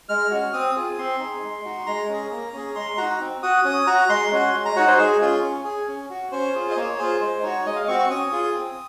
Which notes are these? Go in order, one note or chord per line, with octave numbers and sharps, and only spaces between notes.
G#3 F6
C#4 F#4
C4 D#6
F4 G#4
C4 C6
D#4 G#4
G#3
D#4 F#4
G#3 A#5
C#4 G#4
A#3
C#4 G#4
G#3 C6
D#4 F#4 A#5
C4
F#4 D#6
C#4 D#6
F#4 A#5
G#3 C6
C#4 F#4
G#3
A#5
D#4 F#4 C#5
C5
G#3 G#4
C#4 F4 G#4
C#4
G#4
C#4
F#4
C#4 C5
F4 G#4
D#5
A#3 C#5
F4 G#4 C5
G#3 C5
D#4 F#4 C#5
G#3 D#5
F5
C4 F#4 C#6
C#6
C#4 D#6
F4 G#4
C4